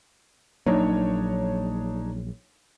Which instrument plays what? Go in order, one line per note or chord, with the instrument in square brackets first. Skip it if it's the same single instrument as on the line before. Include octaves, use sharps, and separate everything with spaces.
[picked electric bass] A#1 F#3 A#3 [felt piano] D4 D#4 C#5